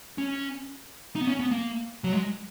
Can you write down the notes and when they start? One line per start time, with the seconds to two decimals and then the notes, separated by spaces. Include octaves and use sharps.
0.18 C#4
1.16 D#4
1.21 B3
1.27 C#4
1.39 B3
1.51 A#3
2.04 F#3
2.13 G#3